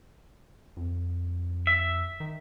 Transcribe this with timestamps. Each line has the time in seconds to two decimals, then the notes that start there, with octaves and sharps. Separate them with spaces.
0.77 F2
1.67 E5
2.20 D#3